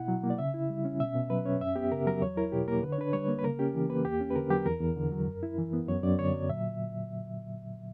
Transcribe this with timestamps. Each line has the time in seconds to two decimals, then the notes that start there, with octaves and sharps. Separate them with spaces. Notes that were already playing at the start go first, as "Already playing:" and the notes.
Already playing: B2 E4 F#5
0.08 F#3
0.23 A#3
0.30 D5
0.38 C#3 E5
0.54 E4
0.70 G3
0.85 C#4
1.00 B2 E5
1.15 B2
1.30 F#3 B4
1.45 C#4 C#5
1.60 F#2 E5
1.76 B3 G4
1.92 C#3 A#4
2.06 F#3 A#4
2.22 E2 C#5
2.37 E4 A#4
2.52 B2 G4
2.68 A#3 A#4
2.83 D3 B4
2.92 C#5
2.98 D4 B4
3.13 G3 C#5
3.28 A#3
3.39 B4
3.44 C#3 A#4
3.59 C#4 G4
3.75 E3
3.89 A#3 B4
4.05 E2 G4
4.21 C#4
4.30 B4
4.35 D3 A#4
4.50 F#3 G4
4.66 E2 A#4
4.81 E2
4.96 D3
5.12 F#3
5.27 F#2
5.43 E4
5.58 E3
5.73 B3
5.88 F#2 C#5
6.03 F#2 D5
6.19 D3 C#5
6.34 F#3
6.49 A#2 E5